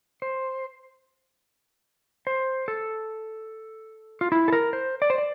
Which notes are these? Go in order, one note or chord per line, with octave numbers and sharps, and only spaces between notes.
C5
C5
A4
F4
E4
A4
A#4
C5
D5
C5
D5